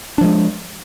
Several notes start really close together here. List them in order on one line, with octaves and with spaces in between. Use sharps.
D4 F3 G#3